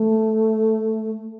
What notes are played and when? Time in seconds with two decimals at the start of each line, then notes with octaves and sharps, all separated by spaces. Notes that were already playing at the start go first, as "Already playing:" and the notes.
Already playing: A3